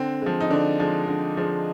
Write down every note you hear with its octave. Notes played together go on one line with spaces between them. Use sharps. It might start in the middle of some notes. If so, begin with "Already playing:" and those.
Already playing: D3 C4
F3 G#3
D#4
D3 D4
F3 G#3
D3
F3 G#3